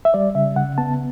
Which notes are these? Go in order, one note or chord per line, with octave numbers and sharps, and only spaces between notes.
E5
G3 D5
C#3 E5
C#3 F#5
B3 A5